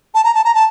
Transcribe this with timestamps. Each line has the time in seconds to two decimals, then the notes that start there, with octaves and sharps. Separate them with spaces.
0.15 A5
0.24 A#5
0.34 A5
0.45 A#5
0.55 A5